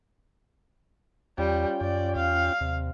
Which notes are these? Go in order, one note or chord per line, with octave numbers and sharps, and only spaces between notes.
E2 G3 C#4 F4 G5
F#2 D5
E2 F5
D#2 C3